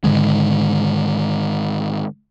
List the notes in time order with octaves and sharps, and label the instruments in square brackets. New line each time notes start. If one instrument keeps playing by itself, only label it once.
[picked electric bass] G#2 D3 D#3 G#3